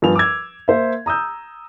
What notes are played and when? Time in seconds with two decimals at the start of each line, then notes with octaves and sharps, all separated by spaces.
0.02 G2 F3 B3 G#5 F7
0.16 D6 E6 G#6
0.68 A#3 C5 E5
1.06 A#5 D#6 E6 G6